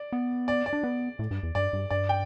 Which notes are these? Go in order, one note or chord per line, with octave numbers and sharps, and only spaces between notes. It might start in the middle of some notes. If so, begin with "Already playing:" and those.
Already playing: D5
B3
D5
D5
D4
B3
A2
G2
E2
G2 D5
G2
G2 D5
G5